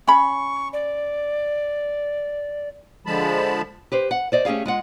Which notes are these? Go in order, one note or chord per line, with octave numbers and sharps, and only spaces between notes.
C#4 B5 C#6
D5
D3 F3 G#3 A5 B5
G4 B4 C5
F#5
C5 D5 D#5
A3 C#4 G4 G#4 F5
G#3 F4 F#5